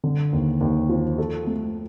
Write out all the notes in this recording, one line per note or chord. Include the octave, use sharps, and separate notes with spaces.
D3
D#2
D#2
F3
A4
A3